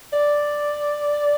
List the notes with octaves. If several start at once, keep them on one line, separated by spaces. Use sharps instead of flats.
D5